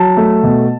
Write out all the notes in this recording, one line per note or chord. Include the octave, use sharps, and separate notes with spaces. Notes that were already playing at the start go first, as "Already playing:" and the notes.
Already playing: F#3 A5
A3
B2